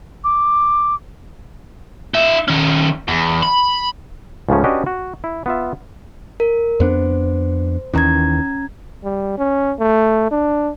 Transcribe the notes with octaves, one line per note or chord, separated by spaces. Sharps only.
D6
D#4 E5
D#3 C#4
E2
B5
C#2 G#2 C#3 F3 A3 C#4
C#4 D4 F#4 G4 B4 D#5
F#4
E4
B3 F4 E5
A#4
F2 B3 D4 C5
D#2 D#3 E3 C#4 A#5 G#6
G3
C#4
A3
D4